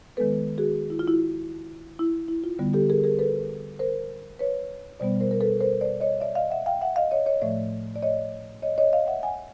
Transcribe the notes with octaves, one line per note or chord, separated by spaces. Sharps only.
D#3 G#3 B3 A4 B4
F#4 G#4
E4
F4
E4 F#4
E4
E4
F4
D3 G3 B3
G4 A4
G#4 A#4
G#4 A#4
A4 B4
A#4 C5
B4 C#5
B2 G3 B3 C5 D5
A#4 C5
A#4
A4 B4
A#4 C5
C5 D5
C#5 D#5
D5 E5
D#5 F5
E5 F#5
F5 G5
E5 F#5
D#5 F5
C#5 D#5
C#5 D#5
A2 F3 A3 D5 E5
D5
C#5 D#5
C#5 D#5
C#5 D#5
D#5 F5
E5 F#5
F#5 G#5